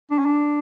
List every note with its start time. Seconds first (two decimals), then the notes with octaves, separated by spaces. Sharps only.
0.11 D4
0.19 C#4
0.26 D4